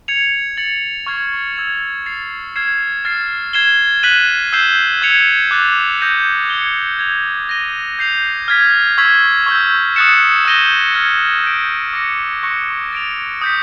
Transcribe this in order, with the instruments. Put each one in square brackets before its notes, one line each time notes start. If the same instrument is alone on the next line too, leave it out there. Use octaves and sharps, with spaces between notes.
[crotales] G#6 C#7 F7
A6 C#7 F#7
C#6 F6 G#6 C7
E6 G#6 C#7 F7
A6 C7 F7
F6 G#6 C7 E7
F6 A6 C7
G#6 C7 E7 G7
F#6 B6 D#7 F#7
E6 G6 C7 E7 G7
E6 G#6 C#7 F7
D6 F#6 A6
D#6 G6 A#6 D#7
G#6 C#7 E7 G7
G#6 C#7 F7
G6 A#6 D#7 G7
G6 C7 F7
F6 G#6 B6
C#6 E6 G#6 B6
C#6 E6 G6
D#6 F#6 A6 C#7 E7
E6 G6 A#6 D#7 G7
F6 G#6 C#7
G6 B6 D7
D6 F6 A#6 C#7
C#6 F#6 A#6 C#7
A6 D7 F7
D#6 G6 B6